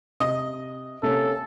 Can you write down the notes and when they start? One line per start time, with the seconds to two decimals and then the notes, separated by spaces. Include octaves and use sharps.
0.20 C3 D#5
1.03 C3 A#3 C#4 A4